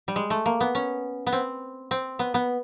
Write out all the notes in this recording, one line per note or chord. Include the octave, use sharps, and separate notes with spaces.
G3
G#3
A3
A#3
B3
C#4
B3
C4
C4
B3
B3